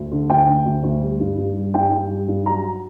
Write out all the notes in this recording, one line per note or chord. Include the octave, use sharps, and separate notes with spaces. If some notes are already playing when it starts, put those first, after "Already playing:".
Already playing: D2
D3
D2 G5
D3
D2
D2
G3
G2
G2
G3
G2 G5
G2
G3
G2
F#3 A#5